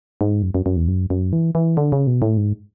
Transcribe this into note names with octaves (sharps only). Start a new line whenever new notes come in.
G#2
F#2
F#2
F#2
E2
F#2
F#2
E3
E3
D3
C#3
B2
A2
G#2